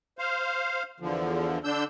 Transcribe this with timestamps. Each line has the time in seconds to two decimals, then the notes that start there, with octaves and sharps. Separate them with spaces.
0.19 C5 F5
1.00 E2 D3 F3
1.64 D3 D4 E6 G6